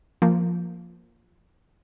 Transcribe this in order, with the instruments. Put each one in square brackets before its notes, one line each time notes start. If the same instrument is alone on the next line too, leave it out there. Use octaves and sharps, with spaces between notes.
[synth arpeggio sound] F3 A#3